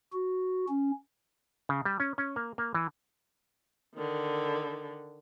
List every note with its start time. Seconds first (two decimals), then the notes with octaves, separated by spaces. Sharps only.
0.13 F#4
0.69 C#4
1.69 C#3
1.85 G3
2.00 C#4
2.18 C#4
2.36 A#3
2.58 A#3
2.74 E3
3.95 D3 D#3